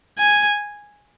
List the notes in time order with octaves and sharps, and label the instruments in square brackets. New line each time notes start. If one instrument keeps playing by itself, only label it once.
[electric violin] G#5